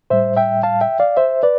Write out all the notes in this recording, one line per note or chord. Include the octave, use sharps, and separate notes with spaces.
A2 G3 C5 E5
E5 G5
F5 A5
E5 G5
D5 F5
C5 E5
B4 D5